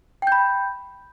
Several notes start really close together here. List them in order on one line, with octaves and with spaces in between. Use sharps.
G5 G6 B5